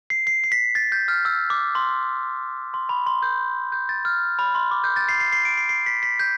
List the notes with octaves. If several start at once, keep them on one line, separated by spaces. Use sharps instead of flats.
C7
C7
C7
B6
A6
G6
F6
E6
D6
C6
C6
B5
C6
G6
G6
A6
F6
B5
C6
D6
G6
A6
C7
C7
C7
D7
C7
C7
B6
B6
G6